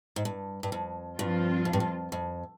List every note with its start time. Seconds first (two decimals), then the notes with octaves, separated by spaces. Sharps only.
0.16 G#2
0.25 G2
0.63 G2
0.72 F2
1.18 G2 F3 C4 F4
1.65 F2
1.73 G2
1.80 F2
2.12 F2